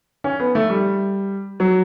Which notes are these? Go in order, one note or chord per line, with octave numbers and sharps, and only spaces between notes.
C#4
B3
A3
G3
F#3